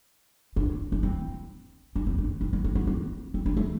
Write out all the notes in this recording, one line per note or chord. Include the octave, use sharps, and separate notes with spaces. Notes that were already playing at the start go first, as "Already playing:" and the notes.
D4
D4
C4
D4
C4
D4
C4
D4
C4
B3
C4
C4
D4
A3